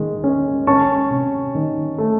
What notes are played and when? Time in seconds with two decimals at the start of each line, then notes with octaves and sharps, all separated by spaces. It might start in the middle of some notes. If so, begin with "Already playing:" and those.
Already playing: D#3 G#3
0.24 C#4
0.67 C#4 A5 C#6
1.10 C3
1.55 D#3
1.98 A3